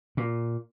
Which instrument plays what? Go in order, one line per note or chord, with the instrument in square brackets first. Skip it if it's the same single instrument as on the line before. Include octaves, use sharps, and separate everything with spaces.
[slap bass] A#2